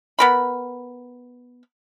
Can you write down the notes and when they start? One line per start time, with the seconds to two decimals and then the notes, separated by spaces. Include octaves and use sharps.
0.19 B3 A#4 B5